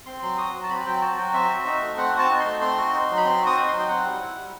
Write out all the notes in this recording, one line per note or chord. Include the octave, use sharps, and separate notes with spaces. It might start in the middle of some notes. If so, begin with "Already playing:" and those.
C4 C6
F#3 C6
F#4 D#6
F#3
A5
C4 B5
F#3 G5
F#4 A5
F#3 G5
C4 E5
F#4
D#4
A3
C4 F#5
F#4
A5
D#4
C6
A3
C4 C6
F#4
D#4
F#3
B5
C4 C6
F#4
D#6
D#4
F#3 C6
G5
C4 F#5
G3
E4
G3